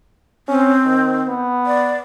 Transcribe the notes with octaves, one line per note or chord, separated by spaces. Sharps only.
C4 C#4
D#3
B3
D5